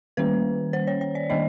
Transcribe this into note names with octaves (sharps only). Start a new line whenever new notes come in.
D#3 G3 A#3 C#4 B4
C5
C#5
C#5
D5
D#3 G3 A#3 D4 D#5